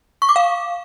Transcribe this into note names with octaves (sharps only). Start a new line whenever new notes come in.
C#6
D6
F5